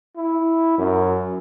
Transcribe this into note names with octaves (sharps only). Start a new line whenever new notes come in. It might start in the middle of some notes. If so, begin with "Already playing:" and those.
E4
F#2